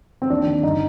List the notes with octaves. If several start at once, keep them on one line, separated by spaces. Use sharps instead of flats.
C4
D#2 D4
D#3
G1 D#4